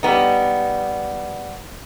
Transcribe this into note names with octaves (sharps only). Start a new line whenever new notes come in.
G3 B3 D#4